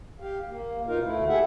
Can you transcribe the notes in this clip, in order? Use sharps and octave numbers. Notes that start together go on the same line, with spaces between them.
G4 F5
A#3
F#2 B2 D#4 F4 A#4 F5
D2 A3 E4
G4 G#4 E5 F#5